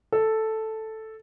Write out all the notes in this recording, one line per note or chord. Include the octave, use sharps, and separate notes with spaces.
A4